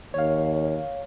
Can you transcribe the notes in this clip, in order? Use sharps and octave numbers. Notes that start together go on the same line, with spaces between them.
D#2 C#5 F5